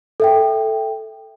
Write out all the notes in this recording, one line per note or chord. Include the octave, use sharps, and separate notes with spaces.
A4 E5 G5